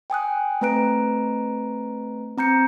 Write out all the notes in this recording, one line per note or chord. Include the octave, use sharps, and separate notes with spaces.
G5 G#5 D#6 F#6
A3 C4 B4 A#5 F#6 D7
C4 A#5 G6 C#7